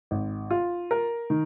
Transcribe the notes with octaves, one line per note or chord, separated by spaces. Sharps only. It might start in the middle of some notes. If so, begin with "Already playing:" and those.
G#1
F4
A#4
D#3